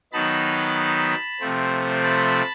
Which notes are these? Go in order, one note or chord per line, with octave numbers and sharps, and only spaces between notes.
D#3 F#3 B3 D#4 A5 B5
C3 F3 A3 C4
A5 B5